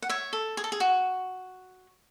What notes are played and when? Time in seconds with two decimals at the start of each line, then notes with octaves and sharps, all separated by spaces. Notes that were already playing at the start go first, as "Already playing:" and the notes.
0.02 F#5
0.09 C#5 E5
0.33 A4
0.57 G#4
0.64 A4
0.72 G#4
0.80 F#4